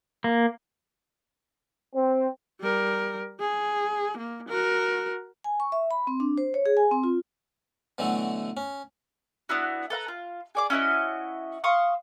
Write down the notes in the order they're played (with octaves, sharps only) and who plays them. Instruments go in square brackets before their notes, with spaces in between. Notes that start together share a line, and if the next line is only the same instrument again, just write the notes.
[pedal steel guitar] A#3
[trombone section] C4
[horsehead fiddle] G3 A#4
G#4
A#3
F#4 A#4
[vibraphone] G#5
C#6
E5
B5
C4
D4
C5
C#5
G#4
G#5
C4
F4
[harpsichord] B2 D3 E3 F#3 A3
C#4
[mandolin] B3 D4 E4 F#4
A4 B4 F5 A#5
F4
G#4 D5 D6
C#4 E4 F#4 D#5
F5 C6 C#6 D#6